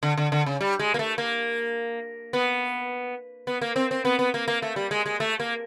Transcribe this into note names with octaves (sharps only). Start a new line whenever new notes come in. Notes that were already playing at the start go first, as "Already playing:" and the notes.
D3
D3
D3
C#3
G3
G#3
A#3
A3
A#3
B3
B3
A#3
C4
C4
B3
B3
A#3
A#3
A3
G3
G#3
G#3
A3
A#3